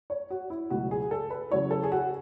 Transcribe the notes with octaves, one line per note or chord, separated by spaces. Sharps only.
C#5
F#4
E4
C#2 B2 F#3 A3 F#4
G#4
A4
B4
C#3 F#3 C#4 E4 C#5
A4
G#4
F#4